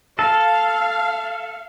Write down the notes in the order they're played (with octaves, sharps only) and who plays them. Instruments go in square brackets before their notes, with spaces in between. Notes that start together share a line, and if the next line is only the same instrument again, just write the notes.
[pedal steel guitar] A4 [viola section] F5